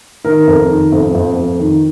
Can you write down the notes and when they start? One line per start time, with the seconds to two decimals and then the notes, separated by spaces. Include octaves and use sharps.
0.25 D#3 A#4
0.47 F2
0.70 D#3
0.92 F2
1.15 F2
1.36 F2
1.60 D#3